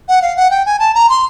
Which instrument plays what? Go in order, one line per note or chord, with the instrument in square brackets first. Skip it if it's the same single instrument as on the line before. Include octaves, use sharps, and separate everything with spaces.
[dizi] F#5
F5
F#5
G5
G#5
A5
A#5
C6